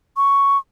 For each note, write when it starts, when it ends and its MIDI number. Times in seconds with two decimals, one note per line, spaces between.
0.17 0.57 85